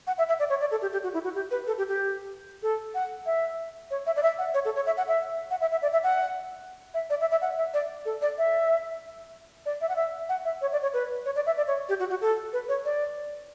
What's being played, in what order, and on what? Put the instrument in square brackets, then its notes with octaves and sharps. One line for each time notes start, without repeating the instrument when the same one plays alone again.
[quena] F#5
E5
E5
D5
C#5
D5
A4
G4
G4
F#4
E4
F#4
G4
B4
A4
G4
G4
A4
F#5
E5
C#5
E5
D5
E5
F#5
C#5
A4
C#5
E5
F#5
E5
F#5
E5
E5
D5
E5
F#5
E5
D5
E5
E5
F#5
E5
D5
A4
D5
E5
D5
E5
F#5
E5
F#5
E5
C#5
D5
C#5
B4
C#5
D5
E5
D5
C#5
G4
F#4
F#4
A4
B4
C#5
D5